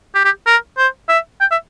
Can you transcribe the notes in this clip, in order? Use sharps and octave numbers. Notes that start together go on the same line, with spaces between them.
G4
G4
A#4
C5
E5
G5
E5